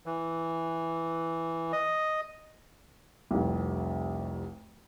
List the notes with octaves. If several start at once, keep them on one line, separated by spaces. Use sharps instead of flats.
E3
D#5
F1 C2